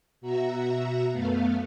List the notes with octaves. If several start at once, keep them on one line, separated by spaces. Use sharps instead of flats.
B2 F#4 E5 A#5 E6
F#2 A3 B3 F5